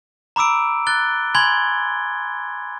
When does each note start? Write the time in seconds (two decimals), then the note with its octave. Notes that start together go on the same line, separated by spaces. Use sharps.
0.36 A#5 B5 D6 E6 D7
0.87 F#6 A6 G7
1.35 G#5 B5 C6 G#6 G7